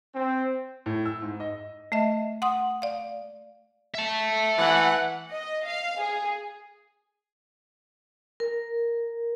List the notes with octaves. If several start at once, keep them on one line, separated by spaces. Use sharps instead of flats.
C4
A2
E6
G#2
D#5
A3 D#5 E5
F#5 C6 D#6
D5 F5
E5 A5
E3 F#5
D#5
F5
G#4
A#4